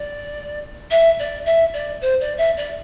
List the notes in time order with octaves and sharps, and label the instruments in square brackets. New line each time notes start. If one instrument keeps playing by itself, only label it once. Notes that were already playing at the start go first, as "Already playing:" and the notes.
Already playing: [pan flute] D5
E5
D5
E5
D5
C5
D5
E5
D5